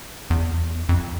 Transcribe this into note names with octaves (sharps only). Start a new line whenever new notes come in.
E2
F2